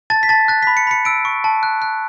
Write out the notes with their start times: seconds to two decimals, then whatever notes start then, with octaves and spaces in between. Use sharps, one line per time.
0.10 A5 A6
0.23 B6
0.29 A5 A6
0.48 F#6 A6
0.63 B5 B6
0.77 C#7
0.87 B5 C#7
1.05 E6 D7
1.25 C#6
1.44 A5
1.63 F#6
1.82 F#6